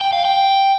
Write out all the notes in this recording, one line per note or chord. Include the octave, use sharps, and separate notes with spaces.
G5
F5
G5